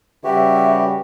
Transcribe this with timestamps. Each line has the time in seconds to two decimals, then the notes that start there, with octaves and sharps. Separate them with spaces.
0.24 C#3 G3 F#4 G4 B4 E5